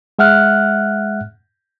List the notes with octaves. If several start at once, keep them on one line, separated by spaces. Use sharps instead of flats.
G#3 E5 F#5 F6 F#6